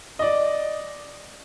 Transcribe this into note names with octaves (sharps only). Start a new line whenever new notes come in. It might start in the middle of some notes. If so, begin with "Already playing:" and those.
D5 D#5